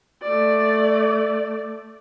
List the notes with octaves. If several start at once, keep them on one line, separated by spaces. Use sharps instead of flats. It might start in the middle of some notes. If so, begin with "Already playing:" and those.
A3 D5